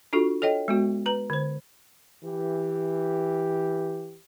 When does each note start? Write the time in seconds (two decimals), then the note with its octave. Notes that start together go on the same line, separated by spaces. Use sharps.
0.13 D4 F4 F#4 A4
0.42 A4 C#5 D#5 G5
0.68 G#3 B3 F#4
1.06 B4 A#5
1.30 D3 C5
2.24 E3 G4